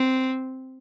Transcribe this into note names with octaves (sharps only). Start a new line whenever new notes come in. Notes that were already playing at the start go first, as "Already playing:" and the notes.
Already playing: C4